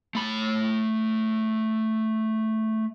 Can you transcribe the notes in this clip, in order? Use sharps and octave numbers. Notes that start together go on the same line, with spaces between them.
A3 B5